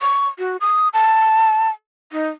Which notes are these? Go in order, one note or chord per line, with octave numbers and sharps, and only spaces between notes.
C#6
F#4
D#6
A5
D#4